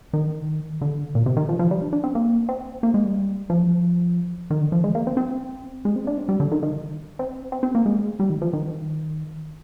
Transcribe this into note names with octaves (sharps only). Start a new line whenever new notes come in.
D#3
D3
A#2
C3
D#3
F3
F3
G3
D4
D4
C4
A#3
C4
A#3
G#3
G3
F3
D#3
D3
F3
G#3
A#3
C4
C4
G#3
C4
D4
C4
G3
D3
D#3
D#3
C4
C4
C4
A#3
G#3
G3
D#3
F3
D#3